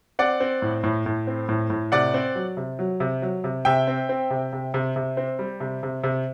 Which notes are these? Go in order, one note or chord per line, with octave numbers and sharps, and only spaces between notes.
C4 D5 F#5
C4
A2
A2
A2
C4
A2
A2
C3 D5 F#5
C4
F#3
C3
F#3
C3
F#3
C3
C3 E5 G5
C4
C4
C3
C3
C3
C3
C4
G3
C3
C3
C3